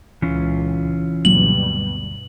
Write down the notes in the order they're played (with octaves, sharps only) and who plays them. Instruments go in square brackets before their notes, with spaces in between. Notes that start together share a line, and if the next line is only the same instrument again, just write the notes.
[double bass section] C#2 A#2 [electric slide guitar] E3 C#4 F4
[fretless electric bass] D2 F#3 A#3 [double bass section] G2 B2 G3 [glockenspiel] F#7